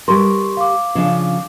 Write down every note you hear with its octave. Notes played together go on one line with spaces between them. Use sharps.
G3 A#4 C6 C#6
F5 D6
C#3 F3 D4